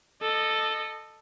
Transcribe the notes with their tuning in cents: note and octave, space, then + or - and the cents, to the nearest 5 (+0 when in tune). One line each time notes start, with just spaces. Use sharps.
A4 +0 D#5 -25